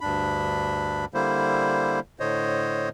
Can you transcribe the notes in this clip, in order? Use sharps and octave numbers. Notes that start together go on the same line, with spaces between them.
D2 G2 D4 B5
D3 G3 A#3 E4 C5
A2 D3 C5 C#5 D#5